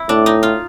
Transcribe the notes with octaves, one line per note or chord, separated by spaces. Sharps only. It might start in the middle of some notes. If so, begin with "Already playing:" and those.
Already playing: E4
A2 D4
D#4
F4